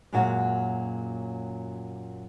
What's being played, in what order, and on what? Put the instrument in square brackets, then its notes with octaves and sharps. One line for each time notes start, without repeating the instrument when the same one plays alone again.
[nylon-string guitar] F#2 A#2 F#3 G#3 F#4